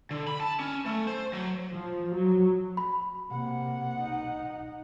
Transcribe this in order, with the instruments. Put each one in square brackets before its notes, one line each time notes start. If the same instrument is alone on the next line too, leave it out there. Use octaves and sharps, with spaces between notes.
[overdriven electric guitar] D3
B5
A5
C#4
A3
C5
F#3
[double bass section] F3
F#3
[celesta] B5
[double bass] C3 A#3 [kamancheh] F#5
[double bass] D#4